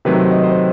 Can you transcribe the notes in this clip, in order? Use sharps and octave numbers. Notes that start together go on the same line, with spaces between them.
C3 D#3 F#3 A3 C4 B4
C5
D#5
C5